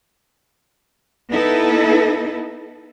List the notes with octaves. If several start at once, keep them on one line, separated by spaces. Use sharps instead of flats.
B3 D#4 E4 A4 B4